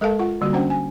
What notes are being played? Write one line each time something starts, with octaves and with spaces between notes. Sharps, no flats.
G#3 A4 A#4 F5 A5
F4 F#5
D3 G3 A#3 F#4
C#4 D4 C5 F#5 G5
G#5